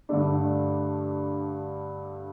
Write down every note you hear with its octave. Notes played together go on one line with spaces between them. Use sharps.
G2 D3 A3 D4